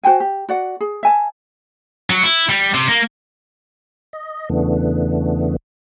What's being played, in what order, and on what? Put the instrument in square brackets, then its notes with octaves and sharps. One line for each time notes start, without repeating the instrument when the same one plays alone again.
[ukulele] F#4 C5 G5 G#5
G4
F#4 D5 F#5
G#4
E5 G#5 A5
[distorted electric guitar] F#3
E4
G3
C3
A#3
[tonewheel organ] D#5
E2 C#3 E3 A3 B3 D4